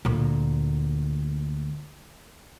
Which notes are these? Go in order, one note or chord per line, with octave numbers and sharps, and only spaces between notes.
D2 A#2